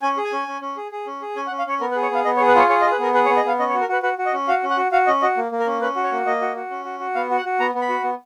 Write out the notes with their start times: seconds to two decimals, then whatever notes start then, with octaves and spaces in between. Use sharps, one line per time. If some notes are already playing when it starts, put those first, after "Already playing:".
0.02 C#4 G#5
0.17 G#4
0.25 G#5
0.32 C#4
0.48 C#4
0.61 C#4
0.77 G#4
0.92 G#4
1.07 C#4
1.22 G#4
1.36 C#4 G#5
1.47 F#5
1.51 C#4
1.59 F5
1.66 C#4 C#5
1.80 B3 A#4
1.91 B4
1.96 G#4
2.02 C#5
2.11 B3 F5
2.25 B3 D#5
2.37 C#5
2.40 G#4
2.48 B4
2.55 F4 C#5
2.69 G#4 C#5
2.81 D#5
2.85 G#4
2.92 B4
2.99 B3 A#4
3.14 G#4 B4
3.25 C#5
3.29 B3
3.37 D#5
3.44 B3 F5
3.59 C#4 D#5
3.69 C#5
3.74 F#4
3.81 A#4
3.89 F#4 B4
4.03 F#4 B4
4.18 F#4
4.26 D#5
4.33 C#4
4.48 F#4 F5
4.63 C#4
4.70 F#5
4.77 F#4
4.92 F#4 F5
5.07 C#4 D#5
5.22 F#4 D#5
5.37 A#3
5.52 A#3
5.60 A#4
5.66 C#4
5.81 C#4 B4
5.96 F#4
6.04 C#5
6.12 A#3
6.26 A#3 D#5
6.41 F#4
6.56 F#4
6.70 C#4
6.85 F#4
7.00 F#4
7.15 B3 F5
7.30 F#4
7.37 F#5
7.45 F#4
7.60 B3 A#5
7.75 B3
7.82 B5
7.89 F#4
8.03 B3